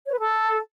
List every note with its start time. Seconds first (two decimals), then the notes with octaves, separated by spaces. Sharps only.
0.06 C#5
0.13 B4
0.19 A4